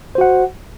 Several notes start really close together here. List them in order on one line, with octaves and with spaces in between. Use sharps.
C5 F#4 F#5